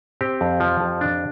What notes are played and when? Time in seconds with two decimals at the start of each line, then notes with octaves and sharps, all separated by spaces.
0.21 C4 G4
0.41 F2
0.60 F3
0.80 F2
1.01 D4